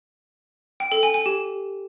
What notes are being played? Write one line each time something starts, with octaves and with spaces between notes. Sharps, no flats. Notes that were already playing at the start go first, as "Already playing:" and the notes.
G5
A4
G#5
G#5
G4